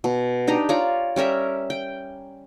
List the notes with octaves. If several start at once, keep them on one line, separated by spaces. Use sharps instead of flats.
B2
D4 D#4 G4 A#5
F4 C#5 D5 A#5
G3 C#4 A#4 E5
G5